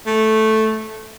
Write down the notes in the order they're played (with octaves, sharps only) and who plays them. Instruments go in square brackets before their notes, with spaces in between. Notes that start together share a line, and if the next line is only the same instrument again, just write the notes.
[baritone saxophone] A3